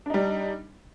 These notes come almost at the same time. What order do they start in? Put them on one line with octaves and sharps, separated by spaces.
D4 D#4 G3